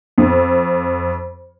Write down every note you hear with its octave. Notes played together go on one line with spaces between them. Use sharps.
F2